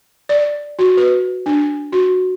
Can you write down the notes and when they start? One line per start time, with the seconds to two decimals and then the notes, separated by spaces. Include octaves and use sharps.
0.29 D5
0.79 F#4
0.97 B4
1.46 D4
1.92 F#4